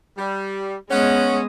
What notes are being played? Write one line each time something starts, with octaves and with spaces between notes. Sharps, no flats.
G3
G#3 B3 C#4 D#5 F#5